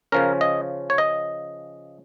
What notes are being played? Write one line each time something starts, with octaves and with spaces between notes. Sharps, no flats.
C#3 F3 C#4 A#4
D#5
C#5
D#5